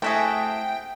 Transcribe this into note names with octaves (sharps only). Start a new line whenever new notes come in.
C3 A3 E4 F#4 G#4 A4 G5